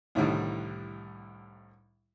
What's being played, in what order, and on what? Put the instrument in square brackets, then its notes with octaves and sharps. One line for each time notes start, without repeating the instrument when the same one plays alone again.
[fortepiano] C2 A2 D3 D#3 G3